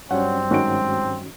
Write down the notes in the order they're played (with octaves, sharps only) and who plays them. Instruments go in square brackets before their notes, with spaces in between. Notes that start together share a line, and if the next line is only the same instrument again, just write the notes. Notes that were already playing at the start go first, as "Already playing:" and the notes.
[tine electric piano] G2 F#3 G3 [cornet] C4 [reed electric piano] C#4 [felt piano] C#5 F#5
[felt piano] G#2 D7 [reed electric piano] D#3 C#4 F#4